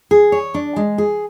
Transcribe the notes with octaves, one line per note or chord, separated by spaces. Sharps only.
G#4
C#5
D4
G#3
G#4